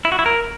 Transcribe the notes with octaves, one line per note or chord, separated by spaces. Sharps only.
E4
F#4
E4
A#4